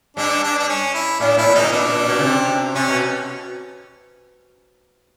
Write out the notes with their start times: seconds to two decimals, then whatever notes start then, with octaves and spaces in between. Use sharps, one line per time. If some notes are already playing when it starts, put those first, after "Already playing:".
0.17 G2 D4
0.43 D4
0.59 D4
0.69 C#4
0.94 E4
1.20 A2 D4
1.37 A2 E4
1.46 A#2
1.55 G#2 D#4
1.64 A2
1.72 A#2 D4
1.89 A#2
2.06 B2
2.19 C#3
2.23 C3
2.75 C3 C#4
2.88 B2